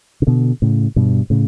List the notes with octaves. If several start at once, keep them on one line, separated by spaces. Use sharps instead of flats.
C#3
B2 D3
A2 C#3
G2 B2
A2 C#3